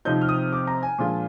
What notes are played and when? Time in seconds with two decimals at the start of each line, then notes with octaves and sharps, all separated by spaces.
0.05 C3 F3 C4 D#4 G6
0.21 F6
0.29 D#6
0.53 D6
0.67 A#5
0.83 G#5
0.98 A#2 F3 G#3 D4 F4